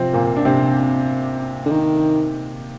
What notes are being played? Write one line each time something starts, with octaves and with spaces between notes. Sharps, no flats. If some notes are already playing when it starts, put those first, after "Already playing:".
Already playing: C3 F3 C4
A#2 A#3
D4
C3 C4
D3
D#3